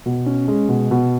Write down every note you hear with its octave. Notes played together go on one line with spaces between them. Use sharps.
B2
C#4
G#3
B2
B2